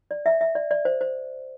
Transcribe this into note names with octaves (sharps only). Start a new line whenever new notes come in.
D5
E5
E5
D5
D5
C5
C5